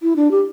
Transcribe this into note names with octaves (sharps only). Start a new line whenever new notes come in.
E4
D4
G4